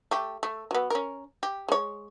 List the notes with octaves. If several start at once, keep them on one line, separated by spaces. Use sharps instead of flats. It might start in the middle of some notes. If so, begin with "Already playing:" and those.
A3 G4
A3
F#3 B3
C#4 A#4
G4
G#3 C#5